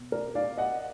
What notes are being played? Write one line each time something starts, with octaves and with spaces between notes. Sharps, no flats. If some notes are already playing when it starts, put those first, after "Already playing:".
Already playing: B2
A#4 D5
D5 F5
D#5 F#5